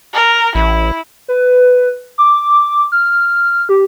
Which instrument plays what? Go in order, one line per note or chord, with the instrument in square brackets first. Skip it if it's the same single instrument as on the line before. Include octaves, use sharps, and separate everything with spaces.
[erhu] A#4
[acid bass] A1 [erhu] E4
[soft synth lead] B4
D6
F6
G4